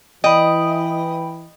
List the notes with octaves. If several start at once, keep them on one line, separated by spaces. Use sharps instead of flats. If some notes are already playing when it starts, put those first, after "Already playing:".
E3 D#5 G5 B5